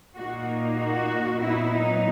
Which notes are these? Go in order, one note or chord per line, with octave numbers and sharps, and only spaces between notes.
A#2 A#3 D#4 F#4
F#4
A#2 F#3 B3 D#4 E4
D#4